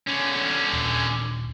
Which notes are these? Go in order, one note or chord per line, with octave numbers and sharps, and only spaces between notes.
D3 C#4
D#1